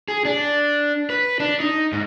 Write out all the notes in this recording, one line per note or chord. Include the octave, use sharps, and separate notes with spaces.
G#4
D4
B4
D4
D#4
G#2